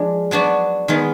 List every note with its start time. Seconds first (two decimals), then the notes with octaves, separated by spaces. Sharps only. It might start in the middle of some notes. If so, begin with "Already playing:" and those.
Already playing: F3 G#3 D4
0.31 F#3 B3 D4 F#4
0.88 D#3 G#3 B3